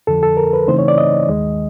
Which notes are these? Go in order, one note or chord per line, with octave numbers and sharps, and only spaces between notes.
F2 D3 F3 A4
A4
A#4
B4
C#3 E3 A3 C4 D#4 C5
C#5
D5
D#5
D#2 D#3 G#3